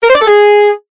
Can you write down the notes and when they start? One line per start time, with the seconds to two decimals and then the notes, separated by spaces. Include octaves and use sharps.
0.02 A#4
0.08 C5
0.14 D5
0.20 A4
0.27 G#4